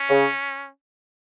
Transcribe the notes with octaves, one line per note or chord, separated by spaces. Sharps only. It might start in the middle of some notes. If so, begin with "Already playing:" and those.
Already playing: C#4
C#3